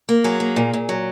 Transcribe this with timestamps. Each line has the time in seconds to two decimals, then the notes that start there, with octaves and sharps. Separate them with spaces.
0.09 A#3
0.24 F#3 G#4
0.40 A#3
0.56 A#2
0.73 A#2
0.89 F#3